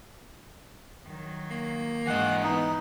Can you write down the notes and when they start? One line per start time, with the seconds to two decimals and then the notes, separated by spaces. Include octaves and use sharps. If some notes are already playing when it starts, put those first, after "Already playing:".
1.06 D#3 F#3
1.51 A#3
2.07 G#2 E3 D#5 F#5
2.43 B3 D#4